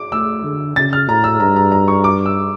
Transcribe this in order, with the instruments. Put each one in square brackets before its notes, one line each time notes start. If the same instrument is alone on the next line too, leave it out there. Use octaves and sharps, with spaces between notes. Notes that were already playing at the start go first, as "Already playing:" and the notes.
Already playing: [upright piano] D6
[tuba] A3 [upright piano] E6
[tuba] D3
[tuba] C#3 [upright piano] A6
[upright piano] F6
[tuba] A2 [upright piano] A#5
[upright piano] E6
[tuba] G2 [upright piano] A#5
[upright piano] A#5
A#5
C#6
D6
E6